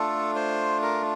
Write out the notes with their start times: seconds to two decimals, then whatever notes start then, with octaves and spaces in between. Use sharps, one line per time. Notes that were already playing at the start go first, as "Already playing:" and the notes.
Already playing: A3 D4 F4 A4
0.35 C5
0.82 A#4